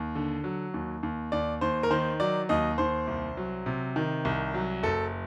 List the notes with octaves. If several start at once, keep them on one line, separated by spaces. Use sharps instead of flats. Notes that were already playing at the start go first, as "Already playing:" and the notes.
Already playing: D#2
D3
F#3
D#2
D#2
D#2 D5
D#2 C5
A#4
D#3 C5
F#3 D5
D#2 D#5
D#2 C5
C2
F#3
C3
D#3
C2
F#3
F#1 A4